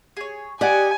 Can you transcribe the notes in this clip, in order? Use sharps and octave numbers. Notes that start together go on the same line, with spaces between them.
G#4 C#5
G4 D5 D#5 F#5 G#5